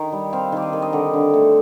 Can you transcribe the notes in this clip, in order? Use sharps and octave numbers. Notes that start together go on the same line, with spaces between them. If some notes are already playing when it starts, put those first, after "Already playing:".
Already playing: D#3 A#5
G3
C4 F5
D#3 D5
D#5
D#3
D#5
D3 D5
D3
A3